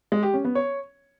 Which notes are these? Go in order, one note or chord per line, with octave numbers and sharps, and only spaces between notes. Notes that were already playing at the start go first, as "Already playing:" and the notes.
G#3
G4
C#4
B3
C#5